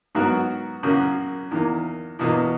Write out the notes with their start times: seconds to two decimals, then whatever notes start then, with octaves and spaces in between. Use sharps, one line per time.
0.15 G#2 F#3 B3 F#4 A#4
0.83 F#2 C#3 F#3 A#3
1.51 E2 D#3 A#3
2.19 E2 B2 A#3